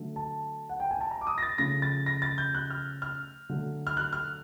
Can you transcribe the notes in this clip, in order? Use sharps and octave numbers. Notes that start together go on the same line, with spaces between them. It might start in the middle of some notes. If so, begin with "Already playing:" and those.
Already playing: D3 F#3 A3
A5
F#5
G5
G#5
A5
A#5
D6
D#6
A#6
A6
C#3 F3 A3 A#6
A6
A#6
A6
G6
F#6
F6
F6
D3 F#3 A3
F6
F#6
F6